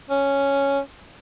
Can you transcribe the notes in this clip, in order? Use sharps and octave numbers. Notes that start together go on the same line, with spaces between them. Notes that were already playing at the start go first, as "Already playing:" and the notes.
C#4